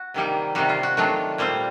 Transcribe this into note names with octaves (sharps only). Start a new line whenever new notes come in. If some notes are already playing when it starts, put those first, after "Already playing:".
Already playing: F#4
C3 D#3 G3 A#3 D#4
C3 D#3 G3 F#4
F4
F#4
D#3 F#3 A3 D4 F4 F#4
A#2 G3 C4 F4